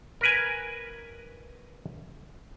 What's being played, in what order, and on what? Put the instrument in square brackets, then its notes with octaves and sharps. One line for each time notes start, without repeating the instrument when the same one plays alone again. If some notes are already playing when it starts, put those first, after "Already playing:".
[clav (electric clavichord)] A#4 B4 G#5